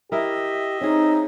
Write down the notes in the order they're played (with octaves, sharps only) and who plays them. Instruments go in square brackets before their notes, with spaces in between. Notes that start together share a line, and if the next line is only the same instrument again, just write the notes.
[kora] E4 A#4 [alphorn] G4 [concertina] D#5 E5
[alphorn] C4 [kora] C#4 G#4 [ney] D#4